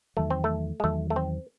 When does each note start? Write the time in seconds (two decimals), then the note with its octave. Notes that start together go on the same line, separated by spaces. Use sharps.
0.16 E2 D#3 F#3 A3
0.30 C4
0.44 A3
0.80 G#3
0.84 E2 D#3 F#3 A3
1.10 A3
1.16 C4